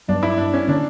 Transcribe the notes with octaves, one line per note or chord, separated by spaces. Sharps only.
G2 F#3 B3 D4
E4
D4
C#4
D3 A#3 C#4 D4